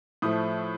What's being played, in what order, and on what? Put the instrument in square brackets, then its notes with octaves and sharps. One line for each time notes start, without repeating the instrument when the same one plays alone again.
[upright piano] A2 F3 A3 D#6